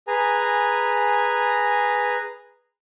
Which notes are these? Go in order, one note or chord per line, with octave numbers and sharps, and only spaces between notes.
G#4 B4 G#5 A#5